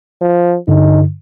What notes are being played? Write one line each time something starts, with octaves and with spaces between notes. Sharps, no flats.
F3
G2 D3 D#4